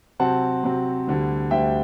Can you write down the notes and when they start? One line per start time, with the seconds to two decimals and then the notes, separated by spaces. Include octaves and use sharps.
0.20 C3 F#3 C4 F#5 A5
0.63 C3 F#3 C4
1.07 D2 D3 G3
1.51 D2 D3 G3 E5 G5